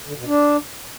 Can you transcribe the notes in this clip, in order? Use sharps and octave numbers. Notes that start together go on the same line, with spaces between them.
D3
B2
D4